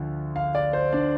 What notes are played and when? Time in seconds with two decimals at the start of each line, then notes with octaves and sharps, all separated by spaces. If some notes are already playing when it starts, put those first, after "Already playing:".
Already playing: D2 D3 F3
0.36 F5
0.55 D5
0.73 C5
0.93 D4